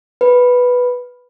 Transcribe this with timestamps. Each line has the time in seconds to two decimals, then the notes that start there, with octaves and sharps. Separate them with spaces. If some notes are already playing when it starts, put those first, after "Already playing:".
0.21 B4